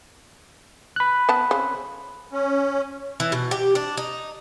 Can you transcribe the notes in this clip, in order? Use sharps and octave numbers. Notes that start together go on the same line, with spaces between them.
B5 F#6
B3 A5
C#3 C4
C#4
E3
B2
G4
D4
D#4